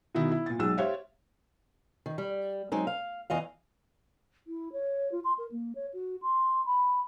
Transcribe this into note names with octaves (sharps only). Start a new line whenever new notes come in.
B2 D#3 E4
E4
A#2 A6
B1 G#3 E6
G4 C5 C#5 E5 F5
D#3
G3
F#3 G#3 C4 D#4
F5
E2 E3 D#5 F5
E4
C#5
F4
C6
A#4
A#3
C#5
F#4
C6
B5